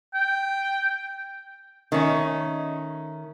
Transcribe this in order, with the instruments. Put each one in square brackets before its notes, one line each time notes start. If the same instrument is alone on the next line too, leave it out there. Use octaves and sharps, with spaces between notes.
[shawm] G5
[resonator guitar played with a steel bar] D#3 A3 C#4